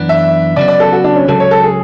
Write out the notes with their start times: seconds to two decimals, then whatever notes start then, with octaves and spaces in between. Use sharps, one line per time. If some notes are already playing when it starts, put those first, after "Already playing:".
Already playing: F#2 E3 B3 D4
0.09 E5
0.56 C#3 F#3 B3 D5
0.68 D5
0.80 A4
0.92 F#4
1.04 D4
1.16 C#4
1.28 C#2 C#3 F#3 A4
1.40 C#5
1.51 A4
1.64 G#4